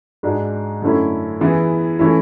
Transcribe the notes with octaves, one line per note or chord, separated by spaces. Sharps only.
G#2 G#3 D4 F#4
F#2 D3 A3 C#4 E4
E3 B3 E4 G#4
E3 A3 C#4 E4